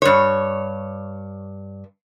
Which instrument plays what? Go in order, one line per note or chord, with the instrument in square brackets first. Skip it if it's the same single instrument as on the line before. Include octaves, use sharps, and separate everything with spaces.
[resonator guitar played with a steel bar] G2 C#5